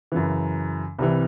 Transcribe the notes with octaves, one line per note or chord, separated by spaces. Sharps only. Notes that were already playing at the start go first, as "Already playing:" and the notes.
F#2 C#3 E3
C2 C3 E3